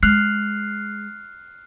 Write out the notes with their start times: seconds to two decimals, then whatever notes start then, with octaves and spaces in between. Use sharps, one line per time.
0.03 G#3 F6 F#6 C7